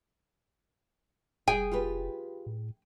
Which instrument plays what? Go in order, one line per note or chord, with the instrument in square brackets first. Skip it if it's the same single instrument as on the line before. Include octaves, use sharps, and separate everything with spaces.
[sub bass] F1 [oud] G#4 [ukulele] G5
[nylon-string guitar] F4 G4 B4
[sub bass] A2